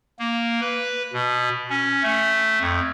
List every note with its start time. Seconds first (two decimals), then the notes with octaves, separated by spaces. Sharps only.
0.19 A#3
0.61 B4
1.13 B2
1.70 C#4
2.03 A3
2.61 F2